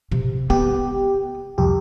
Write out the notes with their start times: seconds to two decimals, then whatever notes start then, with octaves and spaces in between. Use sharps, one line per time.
0.11 C3
0.50 B3 G4
1.58 C2 F2 G4